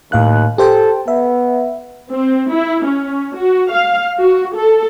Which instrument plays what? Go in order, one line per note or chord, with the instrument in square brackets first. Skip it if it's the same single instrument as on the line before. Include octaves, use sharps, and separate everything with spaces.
[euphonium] D#2 [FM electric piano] A2 F5 F#6
[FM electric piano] G4 C5 G5 [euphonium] A4
[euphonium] B3 [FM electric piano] E5
[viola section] C4
E4
C#4
F#4
F5
F#4
A4